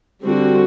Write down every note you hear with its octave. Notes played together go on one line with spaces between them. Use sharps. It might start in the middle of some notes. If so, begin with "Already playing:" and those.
D3 G3 C4 F#4